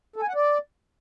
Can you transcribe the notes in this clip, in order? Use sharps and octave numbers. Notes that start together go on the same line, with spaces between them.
A4
G#5
F#5
D5